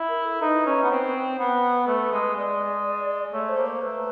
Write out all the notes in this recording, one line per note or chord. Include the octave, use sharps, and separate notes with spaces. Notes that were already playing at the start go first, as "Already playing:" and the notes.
Already playing: E4
A#4
A4
D#4 B4
C#4
B3
C4
B3 B4
A3
G#3
G#3 D5
A3 C#5
C5
A#3
C5
A3 B4